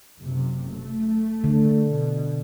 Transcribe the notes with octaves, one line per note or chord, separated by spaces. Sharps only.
F#1 C3
A3
D3
B2